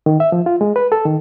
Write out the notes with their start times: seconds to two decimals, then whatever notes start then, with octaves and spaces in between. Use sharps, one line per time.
0.06 D#3
0.20 E5
0.32 F3
0.46 F4
0.61 G#3
0.76 B4
0.92 A4
1.05 D#3